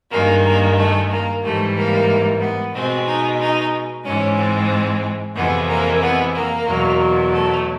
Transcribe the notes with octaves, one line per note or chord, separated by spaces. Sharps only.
G2 D#3 G#3 A#3
A#3
A3
A#3
G#2 E3 G3 A3
A#3
B3
B2 G#3 C4
D#4
D#4
G#2 E3 G#3 C#4
C4
F2 C3 E3 G#3 B3
A#3
B3
A#3
E2 B2 F#3
A3